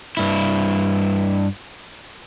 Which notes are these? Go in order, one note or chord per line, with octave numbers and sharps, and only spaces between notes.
G2 E4